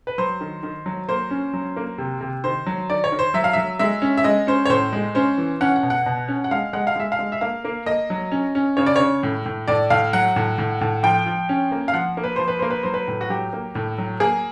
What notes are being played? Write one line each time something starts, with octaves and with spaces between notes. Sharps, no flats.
B4
F#3 C5
D#3
D#3
F#3
A#3 C5
C#4
F#3
A#3
C3
C3
D#3 C5
F#3
D#3 D5
C#5
D#3
C5
F#3 E5
F5
F#3 E5
G#3 E5
C#4
E5
G#3 D#5
C#4 C5
C#5
A2 C5
G#3
C#4 C5
E3
C#4 F#5
F#5
B2
F#5
B2
C#4
F#5
G#3 F5
G#3 F#5
F5
G#3 E5
F5
G#3
E5
A#3 F5
A#3
A#3 D#5
F#3
C#4
C#4
C#3 C#5
D5
C#3 C#5
A2
A2
A2 D5
A2 F5
F#3 F#5
A2
A2
A2
F3 G5
F3
C#4
A#3
F5
F3 F#5
A#3
B4
F3 C5
B4
A#3 C5
B4
F#3 C5
B4
A2
F#4
F#3 G4
A#3
A2
F#3
A#3 G#4